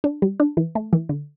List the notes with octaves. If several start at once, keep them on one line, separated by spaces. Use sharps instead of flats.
D4
G3
D4
E3
A3
E3
D3